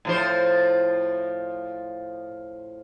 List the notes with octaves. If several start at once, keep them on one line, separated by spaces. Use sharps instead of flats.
A2 F3 C5